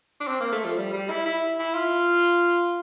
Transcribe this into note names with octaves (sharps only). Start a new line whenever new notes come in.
D4
C4
A#3
A3
F3
G3
G3
E4
E4
E4
F4